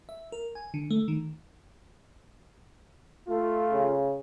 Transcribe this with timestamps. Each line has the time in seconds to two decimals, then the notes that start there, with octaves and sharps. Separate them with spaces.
0.09 E5
0.32 A#4
0.55 G#5
0.74 D3
0.91 A3
1.08 D#3
3.28 A3 F4
3.72 C#3